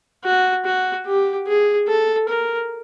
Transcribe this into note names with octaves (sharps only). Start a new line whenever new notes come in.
F#4
F#4
G4
G#4
A4
A#4